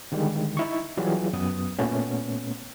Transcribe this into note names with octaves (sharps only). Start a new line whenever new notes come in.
D3 D#3 G3 G#3
D#4 E4 C#6
E3 F#3 G3 F4 G#4
F#2 B3 D#6
A#2 A3 B3 C#4